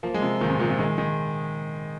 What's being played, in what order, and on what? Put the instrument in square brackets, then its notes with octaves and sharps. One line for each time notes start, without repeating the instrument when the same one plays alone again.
[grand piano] F3 A#3
G#3
C3 F3
A#2 D#3
G#2 C3
A#2 D#3
C3 F3
D#3 G#3
D#3 G#3